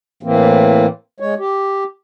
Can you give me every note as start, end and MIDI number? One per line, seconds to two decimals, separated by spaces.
0.23 0.87 45
0.23 0.87 52
0.23 0.87 58
0.23 0.87 60
1.20 1.34 56
1.20 1.34 73
1.39 1.84 67